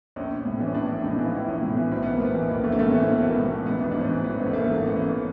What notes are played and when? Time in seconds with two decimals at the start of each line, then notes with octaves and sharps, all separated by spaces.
0.16 A#1 C#4
0.31 A#1
0.45 A2
0.60 E3 D4
0.68 C#4
0.75 A#1 D4
0.89 A#1
0.99 D4
1.04 A2 D#4
1.15 E4
1.19 E3
1.25 F4
1.33 A#1 E4
1.48 A#1 C#4
1.62 A2
1.77 E3
1.92 B1 C4
2.03 B3
2.06 B1
2.13 A#3
2.20 A2 B3 C4
2.35 E3 C4
2.49 B1 A#3
2.63 B1 A3
2.72 A#3
2.79 A2 A3
2.91 E3 C#4
3.01 C4
3.07 B1 B3
3.23 B1 A#3
3.37 A2
3.52 E3
3.65 A1 B3
3.80 A1 D#4
3.91 G#2 D4
4.01 C#4
4.09 E3 C4
4.24 A1 B3
4.33 C#4
4.38 A1 C4
4.46 A3
4.53 G#2 A#3
4.64 A3
4.67 E3
4.75 A#3
4.82 A1 B3
4.96 A1 C#4